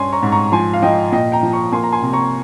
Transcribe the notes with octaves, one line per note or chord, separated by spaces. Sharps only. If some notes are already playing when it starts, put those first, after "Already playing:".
Already playing: G2 C#4 G#5 C6
A#5 C#6
G#2
A#5 C#6
F3 G#5 C6
F5
F3 D#5 G5
A#2 D#5 G5
G5 A#5
F3
A#5 C#6
A#3 G#5 C6
A#5
G#5 C6
C3
A#5 C#6